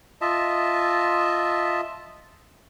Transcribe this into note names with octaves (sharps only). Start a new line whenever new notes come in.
F4 D#5 E5 A5